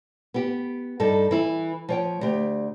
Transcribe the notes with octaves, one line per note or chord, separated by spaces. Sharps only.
B3 G4
G2 D#4 A4
E3 E4
F3 C#5 G5
D2 G4